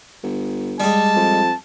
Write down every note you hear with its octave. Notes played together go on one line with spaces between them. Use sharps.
G1
G3 G#3 A5
F2